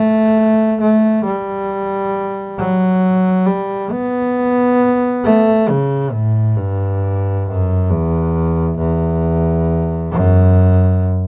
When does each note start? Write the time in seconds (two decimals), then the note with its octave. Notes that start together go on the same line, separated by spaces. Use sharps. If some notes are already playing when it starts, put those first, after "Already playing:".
Already playing: A3
0.81 A3
1.25 G3
2.58 F#3
3.47 G3
3.91 B3
5.24 A3
5.69 C#3
6.12 A2
6.56 G2
7.46 F#2
7.90 E2
8.78 E2
10.11 F#2